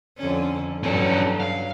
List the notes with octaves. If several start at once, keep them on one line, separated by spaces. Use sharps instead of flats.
F2 D3 C#4
G2 F#3 C#4 A4
F5